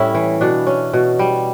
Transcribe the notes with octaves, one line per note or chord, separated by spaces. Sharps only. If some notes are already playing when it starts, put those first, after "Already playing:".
Already playing: A2 G3 C#4 E4
E3
B2 D4
C#4
B2
G3